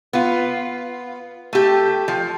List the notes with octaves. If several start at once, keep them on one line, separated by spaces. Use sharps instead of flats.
B3 F4
A3 G4
F3